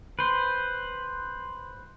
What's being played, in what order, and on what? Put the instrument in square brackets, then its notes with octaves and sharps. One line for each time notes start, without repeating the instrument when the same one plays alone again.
[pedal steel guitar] B4 C5